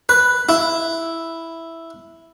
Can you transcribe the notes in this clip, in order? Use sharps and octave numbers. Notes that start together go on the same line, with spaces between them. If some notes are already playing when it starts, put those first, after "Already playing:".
B4
E4